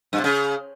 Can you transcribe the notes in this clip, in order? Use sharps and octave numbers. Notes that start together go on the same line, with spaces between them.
G2
C3
C#3